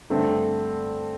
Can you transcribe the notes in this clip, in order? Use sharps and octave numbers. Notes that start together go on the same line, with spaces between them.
G2 D3 A3 C4